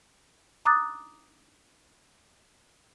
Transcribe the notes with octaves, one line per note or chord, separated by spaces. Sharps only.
A#5 D6 D#6 F#6 A6